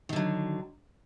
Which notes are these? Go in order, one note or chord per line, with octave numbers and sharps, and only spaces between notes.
D3 D#3 F#3